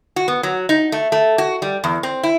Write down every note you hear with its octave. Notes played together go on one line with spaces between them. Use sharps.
F#4
B3
F#3
D#4
A3
A3
F#4
G3
E2
C4
E4